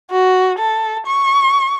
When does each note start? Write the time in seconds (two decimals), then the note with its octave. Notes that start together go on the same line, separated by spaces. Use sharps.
0.11 F#4
0.58 A4
1.06 C#6